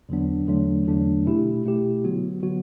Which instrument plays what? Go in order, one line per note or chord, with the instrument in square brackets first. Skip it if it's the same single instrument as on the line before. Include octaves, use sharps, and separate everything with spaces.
[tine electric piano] E2 D3 F#3 B3 D4
E2 D3 F#3 A3 D4
E2 D3 F#3 A3 D4
B2 A3 E4 G4
B2 A3 E4 G4
D3 F#3 B3 F#4
D3 F#3 B3 F#4